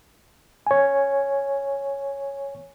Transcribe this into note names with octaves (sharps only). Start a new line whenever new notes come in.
C#5 G#5